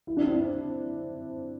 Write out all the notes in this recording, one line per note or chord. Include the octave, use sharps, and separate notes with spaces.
E4
D4
C4 E4